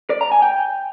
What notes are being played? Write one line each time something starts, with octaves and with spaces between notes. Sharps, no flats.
D5
A#5
G#5
G5